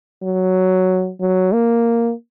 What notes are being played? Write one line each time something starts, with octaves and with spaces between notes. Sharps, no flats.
F#3
F#3
A#3